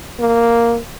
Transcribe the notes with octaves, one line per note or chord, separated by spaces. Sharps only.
A#3